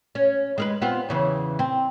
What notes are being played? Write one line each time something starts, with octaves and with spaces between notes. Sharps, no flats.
C#4
G#3 A#4 B4
B3 C4 F4
E2 C#3 E3
C4